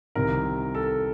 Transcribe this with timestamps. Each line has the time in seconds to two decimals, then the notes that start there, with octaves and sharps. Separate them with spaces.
0.15 C2 C3 D#3 A#4
0.75 A4